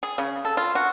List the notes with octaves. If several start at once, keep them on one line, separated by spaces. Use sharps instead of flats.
G#4
C#3
A4
F4
F#4